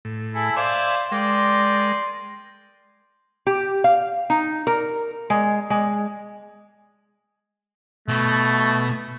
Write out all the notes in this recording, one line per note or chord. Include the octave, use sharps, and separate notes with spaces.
A2
E4 G#4 A4
C5 D5 E5 F5 G#5
G#3 A#4 D5 G5 C6
G4
F5
D#4
A#4
G#3
G#3
B2 A3